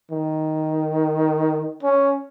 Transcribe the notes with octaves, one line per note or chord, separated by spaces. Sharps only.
D#3
C#4